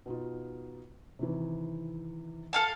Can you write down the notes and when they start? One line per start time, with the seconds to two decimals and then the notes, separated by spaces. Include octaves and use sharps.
0.06 B2 D#4 F4
1.19 C3 D#3 E3
2.53 A4 F5 A5